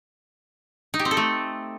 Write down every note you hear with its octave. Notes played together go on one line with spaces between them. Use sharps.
D#4
G4
C4
A4
A3